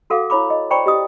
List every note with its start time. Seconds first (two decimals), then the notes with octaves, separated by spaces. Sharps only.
0.10 F#4 A4 F5 F#5 D6
0.30 E4 C#5 B5 D6
0.50 D#5
0.70 C5 D5 G5 A#5 B5 C#6
0.86 G4 D#5 D#6